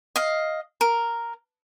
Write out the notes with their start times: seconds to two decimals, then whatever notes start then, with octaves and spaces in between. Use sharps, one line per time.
0.16 D#5 F5
0.81 A#4